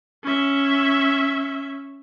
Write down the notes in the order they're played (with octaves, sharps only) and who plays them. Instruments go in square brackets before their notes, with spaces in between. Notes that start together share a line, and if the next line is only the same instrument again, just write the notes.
[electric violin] C#4 E5